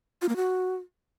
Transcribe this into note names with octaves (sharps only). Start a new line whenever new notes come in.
F4
A#3
F#4